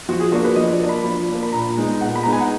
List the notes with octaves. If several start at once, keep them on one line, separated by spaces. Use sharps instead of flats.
F3 F#4
G#4
A#3 D4 F#4
B4
F3 D#5
D5
A#3 D4
B5
F3
A#3 D4
B5
A#2 A#5
G#3 B3 D#4
A#2 F#5
B5
G#3 B3 D#4 A#5
G#5
F#5